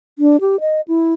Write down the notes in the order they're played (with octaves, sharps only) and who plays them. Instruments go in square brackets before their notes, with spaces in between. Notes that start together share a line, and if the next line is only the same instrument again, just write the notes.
[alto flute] D4
G4
D#5
E4